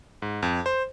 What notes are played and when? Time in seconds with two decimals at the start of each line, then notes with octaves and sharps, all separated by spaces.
0.22 G#2
0.43 F2
0.66 C5